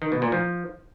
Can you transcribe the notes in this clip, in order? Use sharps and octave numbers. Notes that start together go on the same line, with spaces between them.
D#3
B2
A#2
F3